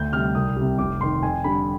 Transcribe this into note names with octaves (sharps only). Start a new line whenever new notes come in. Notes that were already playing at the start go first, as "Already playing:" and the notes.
Already playing: D2 G6
C3 G3 F6
C2 D#6
C3 G3
F1 D6
F2 D#3 C6
F2 G#5
D3 G3 B5